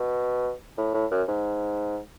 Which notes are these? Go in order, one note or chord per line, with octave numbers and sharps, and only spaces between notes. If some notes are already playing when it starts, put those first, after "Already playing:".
Already playing: B2
A2
A2
F#2
G#2